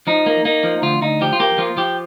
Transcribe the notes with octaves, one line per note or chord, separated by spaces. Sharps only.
F3 D#4
A#3
A#3 D#4
F3
D2 F4
D2 D#4
F3 G4
F4
A#3 G4
F3 F4
F3 G4